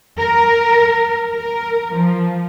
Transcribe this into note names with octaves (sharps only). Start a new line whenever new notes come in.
A#4
A#4
F3